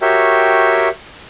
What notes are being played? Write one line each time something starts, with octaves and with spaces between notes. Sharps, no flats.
F#4 G4 A#4 C#5 E5 G5